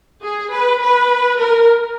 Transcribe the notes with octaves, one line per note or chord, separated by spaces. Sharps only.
G#4
B4
B4
A#4